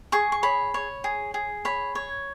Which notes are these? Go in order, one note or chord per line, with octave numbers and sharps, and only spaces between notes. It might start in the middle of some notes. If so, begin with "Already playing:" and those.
G#4 C#6
C#6
C#5 B5
C#5
G#4
G#4
C#5 B5
C#5